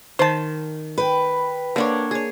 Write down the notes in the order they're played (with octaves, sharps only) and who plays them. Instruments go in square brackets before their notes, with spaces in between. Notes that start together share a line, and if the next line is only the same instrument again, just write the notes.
[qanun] D#3 [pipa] C5 A5
[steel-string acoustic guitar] B4 G5
[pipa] D3 [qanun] A#3 D4 C#5
[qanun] G#4 C#5